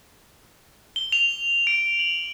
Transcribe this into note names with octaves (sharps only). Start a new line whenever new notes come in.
G7
F7
D7
F#7